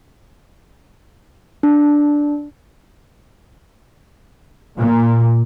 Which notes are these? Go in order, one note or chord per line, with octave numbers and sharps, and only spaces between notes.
D4
A#2